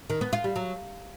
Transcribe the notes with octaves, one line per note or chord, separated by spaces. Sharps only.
D#3
B3
F4
G3
F#3